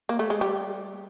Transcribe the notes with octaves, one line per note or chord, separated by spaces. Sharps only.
A#3
A3
G#3
G3